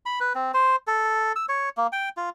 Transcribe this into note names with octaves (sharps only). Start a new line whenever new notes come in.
B5
B4
C4
C5
A4
E6
C#5
A#3
G5
F4